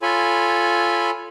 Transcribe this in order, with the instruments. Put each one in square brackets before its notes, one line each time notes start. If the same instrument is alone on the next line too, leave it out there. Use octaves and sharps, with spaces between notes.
[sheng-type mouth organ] F4 A4 C#5 G#5 B5